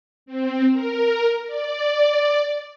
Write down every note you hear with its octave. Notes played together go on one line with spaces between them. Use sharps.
C4
A#4
D5